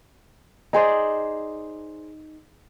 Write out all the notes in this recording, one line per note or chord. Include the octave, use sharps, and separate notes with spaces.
D#4 G#4 C5 D5